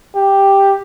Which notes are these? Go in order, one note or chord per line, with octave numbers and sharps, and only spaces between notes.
G4